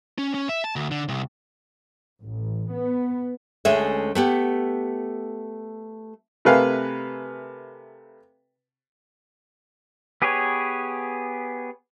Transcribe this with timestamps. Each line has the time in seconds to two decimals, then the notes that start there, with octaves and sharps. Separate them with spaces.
0.18 C#4
0.34 C#4
0.49 E5
0.64 A5
0.76 D2
0.91 D3
1.09 C2
2.22 A1
2.72 B3
3.65 D2 G#3 A3 C#4 G#4 E5
4.15 A3 B3 G4
6.45 C3 A3 A#4 B4 F5 G#5
10.22 B3 G4 G#4 B4 C#5